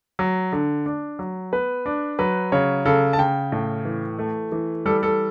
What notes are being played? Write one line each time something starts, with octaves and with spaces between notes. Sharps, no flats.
F#3
D3
D4
F#3
B3 B4
D4
F#3 B4
C#3 C#5
C#3 A4
A5
C#3 G5
A2
E3
A3
E3
G3 A4
A4